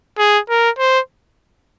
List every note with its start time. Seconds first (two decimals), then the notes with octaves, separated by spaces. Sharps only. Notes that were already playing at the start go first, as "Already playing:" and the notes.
0.19 G#4
0.50 A#4
0.79 C5